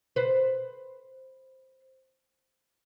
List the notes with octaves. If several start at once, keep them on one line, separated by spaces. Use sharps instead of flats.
B4 C5